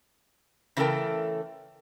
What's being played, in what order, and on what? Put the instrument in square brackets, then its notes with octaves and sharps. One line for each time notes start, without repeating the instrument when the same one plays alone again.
[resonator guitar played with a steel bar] C#3 E3 A3 A4 A#4 G5